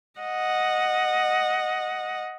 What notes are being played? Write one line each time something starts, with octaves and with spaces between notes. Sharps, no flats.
D#5 F#5